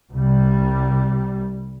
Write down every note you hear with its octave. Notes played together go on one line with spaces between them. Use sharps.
C2 G3